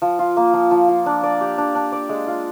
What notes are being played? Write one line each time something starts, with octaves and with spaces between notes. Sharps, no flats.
F3
F4
A#3
F3
F3
F4
D4
D5
G4
D4
D4
D5
G#3
F4